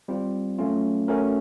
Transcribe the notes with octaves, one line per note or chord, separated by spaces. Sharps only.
G3 C4 F4
F#3 A3 C#4 F4
A3 C#4 F#4 A#4